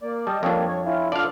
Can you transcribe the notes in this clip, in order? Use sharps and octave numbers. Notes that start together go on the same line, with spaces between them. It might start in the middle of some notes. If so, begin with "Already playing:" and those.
A#3 D5
G3 D#5 A5
F2 G3 A#3 D4 C#5
C#5
C#4 E4 F4
D4 F4 A4 D5 F5